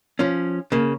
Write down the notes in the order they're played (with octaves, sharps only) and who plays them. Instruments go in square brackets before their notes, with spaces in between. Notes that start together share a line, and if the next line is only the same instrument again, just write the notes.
[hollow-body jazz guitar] F3 C#4
C#3 A#3